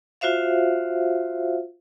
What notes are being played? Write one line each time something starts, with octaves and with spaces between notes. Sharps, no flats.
F4 F#4 C5 E5 F5